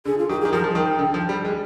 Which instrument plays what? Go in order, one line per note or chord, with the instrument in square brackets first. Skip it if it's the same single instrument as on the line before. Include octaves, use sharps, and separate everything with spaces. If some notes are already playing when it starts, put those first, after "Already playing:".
[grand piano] D3 [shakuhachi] G#4
[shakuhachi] F4
[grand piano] D#3 [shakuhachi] G4
[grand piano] D#3 [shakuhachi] G#4
[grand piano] F3 [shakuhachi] A#4
[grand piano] F3
[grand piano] D#3 [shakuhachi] G5
[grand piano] D3
F3
G3
G#3